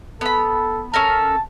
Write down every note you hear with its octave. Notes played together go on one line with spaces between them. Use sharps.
B3 A4 B5
C#4 A4 A#4 A5